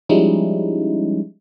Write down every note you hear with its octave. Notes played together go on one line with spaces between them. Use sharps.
F3 G3 G#3 C#4 D#4 E4